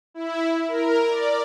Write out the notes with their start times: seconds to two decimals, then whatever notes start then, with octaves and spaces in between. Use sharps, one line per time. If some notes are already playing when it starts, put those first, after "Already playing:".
0.14 E4
0.68 A#4
1.09 D5